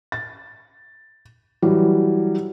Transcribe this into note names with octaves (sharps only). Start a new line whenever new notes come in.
A6
E3 F#3 G3